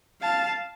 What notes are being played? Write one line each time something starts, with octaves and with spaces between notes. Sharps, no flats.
F5 A5